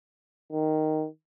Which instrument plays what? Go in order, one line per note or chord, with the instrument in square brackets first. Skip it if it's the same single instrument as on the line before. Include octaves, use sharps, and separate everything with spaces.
[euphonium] D#3